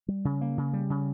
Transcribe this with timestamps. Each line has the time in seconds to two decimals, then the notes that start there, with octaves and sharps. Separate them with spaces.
0.08 G3
0.25 C#3
0.41 A#3
0.58 C#3
0.73 G3
0.90 C#3